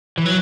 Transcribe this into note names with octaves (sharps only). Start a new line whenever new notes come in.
E3
F#3